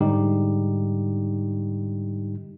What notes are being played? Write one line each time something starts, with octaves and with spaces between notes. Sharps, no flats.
G#2 D3 G3 D#4 G4